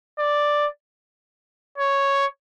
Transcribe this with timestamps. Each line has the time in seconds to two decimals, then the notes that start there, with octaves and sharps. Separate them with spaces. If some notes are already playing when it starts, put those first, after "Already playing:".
0.19 D5
1.78 C#5